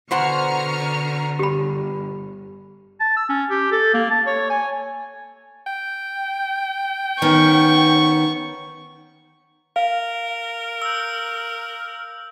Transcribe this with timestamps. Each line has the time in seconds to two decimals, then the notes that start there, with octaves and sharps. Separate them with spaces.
0.11 B2 D3 C5 F#5 A#5 C#6 F6
1.39 G1 G4 B5
3.00 A5
3.17 E6
3.29 C#4
3.50 G4
3.72 A4
3.94 A#3
4.10 A5
4.26 C#5
4.50 G#5
5.67 G5
7.22 D#3 B3 C#4 C#6
9.76 A#4 F5
10.82 E6 G6